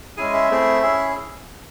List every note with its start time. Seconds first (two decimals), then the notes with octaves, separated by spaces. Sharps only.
0.17 G#3 C#4 E4 G#4 G#5
0.33 E5
0.50 A3 C4 E4 G#4
0.82 C#4 E4 G#4